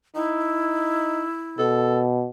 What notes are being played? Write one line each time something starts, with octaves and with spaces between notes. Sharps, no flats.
D#4 E4
B2 A4